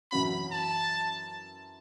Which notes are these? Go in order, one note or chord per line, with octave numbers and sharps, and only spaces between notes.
F#2 E3 C#4 F#4 B5
A5